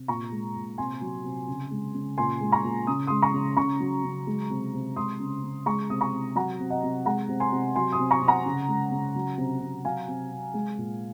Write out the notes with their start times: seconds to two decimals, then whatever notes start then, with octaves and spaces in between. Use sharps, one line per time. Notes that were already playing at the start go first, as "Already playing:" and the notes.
Already playing: C3
0.08 A#2 A#5 C#6
0.31 G#3
0.56 A#2
0.78 C3 G#5 C6
1.01 F#3
1.24 C3
1.48 C#3
1.71 G#3
1.94 C#3
2.18 A#2 G#5 C6
2.41 G#3
2.52 A#5 C#6
2.64 A#2
2.87 C#3 D#6
3.07 G#3 C6 D#6
3.22 A#5 C#6
3.34 C#3
3.57 C#3 A#5 C#6
3.80 F#3
4.04 C#3
4.27 G#3
4.50 C3
4.74 C3
4.96 G#3 C6 D#6
5.20 C#3
5.43 C#3
5.66 G#3 A#5 C#6
5.90 C3 D#6
6.01 A#5 C#6
6.13 C3
6.35 F#3 F#5 A#5
6.59 C3
6.70 D#5 F#5
6.83 C3
7.06 G#3 F#5 A#5
7.29 C3
7.40 G#5 C6
7.52 C3
7.75 F#3 G#5 C6
7.92 C6 D#6
7.99 C3
8.11 A#5 C#6
8.22 C3
8.27 F#5 A#5
8.46 C#3
8.68 G#3
8.92 C#3
9.15 F#3
9.38 C3
9.61 C3
9.84 F#3 F5 G#5
10.08 C3
10.31 C3
10.54 G#3
10.78 A#2